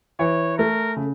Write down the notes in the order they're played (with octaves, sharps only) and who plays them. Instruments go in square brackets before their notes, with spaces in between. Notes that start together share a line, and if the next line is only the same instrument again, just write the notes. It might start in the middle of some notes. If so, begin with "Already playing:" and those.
[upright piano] E3 [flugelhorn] C#5
[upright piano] A3 [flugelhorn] A#4
[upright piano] C#3